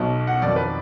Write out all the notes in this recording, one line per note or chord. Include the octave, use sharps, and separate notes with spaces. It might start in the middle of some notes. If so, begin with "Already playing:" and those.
Already playing: B1 B2 F#3
F#5
F2 D#3 F#3 D5
B4